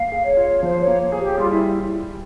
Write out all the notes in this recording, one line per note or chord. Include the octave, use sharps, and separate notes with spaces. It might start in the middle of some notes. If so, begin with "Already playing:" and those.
Already playing: A#3 F5
G#4
C#5
F4
F3 C5
C#5
A#3
G#4
G4
G3 F4
E4